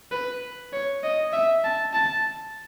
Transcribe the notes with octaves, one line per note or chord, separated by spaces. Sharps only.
B4
C#5
D#5
E5
A5
A5